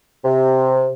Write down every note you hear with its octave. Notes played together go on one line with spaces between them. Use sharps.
C3